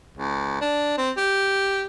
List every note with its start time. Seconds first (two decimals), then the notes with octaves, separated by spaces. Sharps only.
0.18 C#2
0.61 D4
0.98 C4
1.17 G4